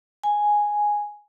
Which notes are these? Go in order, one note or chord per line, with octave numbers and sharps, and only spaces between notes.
G#5